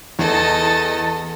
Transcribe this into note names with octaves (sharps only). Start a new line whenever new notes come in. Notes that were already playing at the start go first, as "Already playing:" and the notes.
E2 A4 D#5